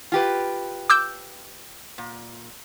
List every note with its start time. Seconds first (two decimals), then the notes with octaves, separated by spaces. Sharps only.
0.12 F4 G4 B4
0.90 D6 E6 G6
1.98 A#2